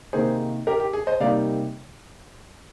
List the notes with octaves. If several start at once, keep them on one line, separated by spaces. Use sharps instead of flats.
C3 D#3 A#3 D#4 G#4 C5
G4 A#4
G4
G#4
C5 D#5
C3 G3 A#3 D#4 D5 F5